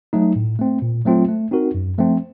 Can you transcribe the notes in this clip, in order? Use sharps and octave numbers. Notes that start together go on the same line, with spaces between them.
F#3 A3 D#4
A2
A3 C4
A#2
F#3 A3 C4 F4
A3
C4 D#4 F#4 A#4
F#2
F3 A3 C4